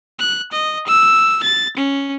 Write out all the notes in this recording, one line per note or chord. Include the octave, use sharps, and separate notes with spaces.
F#6
D#5
E6
A6
C#4